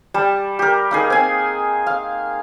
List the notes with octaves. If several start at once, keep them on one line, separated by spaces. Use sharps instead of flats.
G3 A5
G4 A#4
A#3 D#4 G#4
C4 G#5
F5